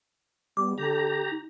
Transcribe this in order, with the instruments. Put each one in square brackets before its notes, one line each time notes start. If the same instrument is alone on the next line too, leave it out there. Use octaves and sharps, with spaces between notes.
[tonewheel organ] G3 [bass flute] B3 [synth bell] D6
[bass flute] D3 [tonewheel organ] G4 A#5
[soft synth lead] D#4